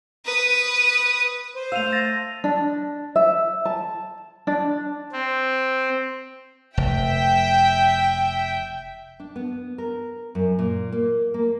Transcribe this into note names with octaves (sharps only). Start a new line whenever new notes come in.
B4 D#6
C5
A3 F5 E6 D#7 F7
A6 A#6
D4
E5
A5
D4
C4
F1 E5 G5
D4
B3
A#4
F#2
A#2
A#3
A#3